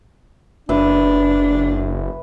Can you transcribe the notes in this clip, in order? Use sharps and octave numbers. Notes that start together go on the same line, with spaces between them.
F#1 D4 B4 E5